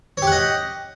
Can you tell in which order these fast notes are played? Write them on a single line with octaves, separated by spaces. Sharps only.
C#5 G4 F#5 D#5